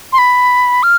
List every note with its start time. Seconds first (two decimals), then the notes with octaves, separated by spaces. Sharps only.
0.13 C6
0.18 B5
0.83 F6